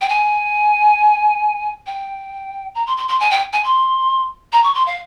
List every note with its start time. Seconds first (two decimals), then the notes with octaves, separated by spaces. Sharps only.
0.01 G5
0.09 G#5
1.86 G5
2.75 A#5
2.86 C6
2.97 C6
3.08 C6
3.20 G#5
3.31 G5
3.53 G#5
3.64 C6
4.52 A#5
4.64 C#6
4.75 C6
4.86 F5